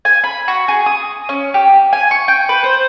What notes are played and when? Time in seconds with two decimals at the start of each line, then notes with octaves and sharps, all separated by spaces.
0.05 G#5
0.24 B5
0.48 F#4
0.68 G#4
0.86 D#6
1.29 C#4
1.54 G4
1.93 G#5
2.11 C#6
2.28 G5
2.49 B4
2.64 C5